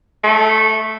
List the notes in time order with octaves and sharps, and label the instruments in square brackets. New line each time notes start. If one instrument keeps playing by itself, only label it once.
[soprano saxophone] A3